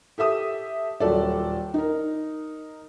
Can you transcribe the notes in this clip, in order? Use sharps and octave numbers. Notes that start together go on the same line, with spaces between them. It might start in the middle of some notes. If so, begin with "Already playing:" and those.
G4 A4 E5 D#6
D#1 F#3 A4 D5
D#4 A#4